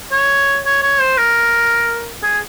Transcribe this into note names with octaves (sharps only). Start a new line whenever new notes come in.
C#5
C#5
C#5
C5
A#4
G#4